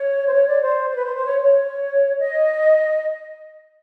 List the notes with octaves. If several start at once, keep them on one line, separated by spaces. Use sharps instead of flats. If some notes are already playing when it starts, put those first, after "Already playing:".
Already playing: C#5
C5
C#5
D5
C5
C5
B4
C5
C5
C#5
C#5
D#5